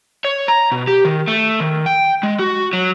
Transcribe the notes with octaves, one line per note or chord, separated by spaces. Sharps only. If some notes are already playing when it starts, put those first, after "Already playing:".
C#5
A#5
B2
G4
D#3
A3
D#3
G5
G#3
F#4
F#3